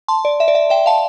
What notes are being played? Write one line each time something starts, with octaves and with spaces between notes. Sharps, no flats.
A5 C6
D5
E5
D5
E5
E5 G5
F5 A5